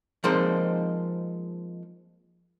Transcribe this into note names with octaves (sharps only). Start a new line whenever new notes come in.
F3 G#3 A#3 C4 D#4 C5